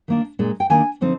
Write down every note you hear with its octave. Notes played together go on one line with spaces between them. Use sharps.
D#3 A#3 D4
A#2 G#3 D4
G5
D#3 A#3 D4 G#5
D3 F3 C4 D#4